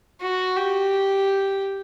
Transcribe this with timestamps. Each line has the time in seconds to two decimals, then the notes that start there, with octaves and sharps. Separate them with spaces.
0.22 F#4
0.56 G4